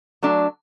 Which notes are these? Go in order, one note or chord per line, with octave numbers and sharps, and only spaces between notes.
F#3 A3 D4